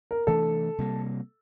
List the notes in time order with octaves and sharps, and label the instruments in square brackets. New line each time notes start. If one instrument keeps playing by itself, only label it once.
[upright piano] A#4
[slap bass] C3 E3 A3 D4 [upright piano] A4
[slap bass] C3 G3 A#3